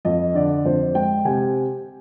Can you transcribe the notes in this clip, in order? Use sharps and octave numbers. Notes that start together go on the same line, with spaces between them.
F2 D#5
D3 D5
F2 C5
G#3 G5
C3 G#5